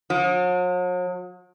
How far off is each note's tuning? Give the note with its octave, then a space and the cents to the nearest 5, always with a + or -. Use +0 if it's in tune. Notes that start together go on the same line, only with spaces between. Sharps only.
F#3 -45